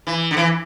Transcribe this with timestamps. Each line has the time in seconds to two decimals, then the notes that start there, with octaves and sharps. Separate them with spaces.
0.07 E3
0.31 D3
0.37 E3